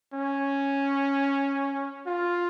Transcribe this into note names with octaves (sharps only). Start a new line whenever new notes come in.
C#4
F4